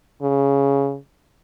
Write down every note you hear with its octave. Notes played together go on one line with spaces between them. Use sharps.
C#3